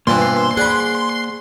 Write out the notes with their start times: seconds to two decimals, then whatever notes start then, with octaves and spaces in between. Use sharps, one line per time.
0.07 G2 B2 E3 A#3 F4 B4 C5 C6
0.57 G#4 D5 F#5 B5